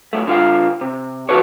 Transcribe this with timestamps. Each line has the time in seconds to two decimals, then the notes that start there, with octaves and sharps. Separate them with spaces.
0.13 F#2 A3
0.27 D3 F4 F5
0.81 C3
1.29 E3 F#4 A4 B4 C#5